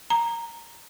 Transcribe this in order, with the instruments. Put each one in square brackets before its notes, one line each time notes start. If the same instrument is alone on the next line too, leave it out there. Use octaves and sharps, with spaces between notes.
[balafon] A#5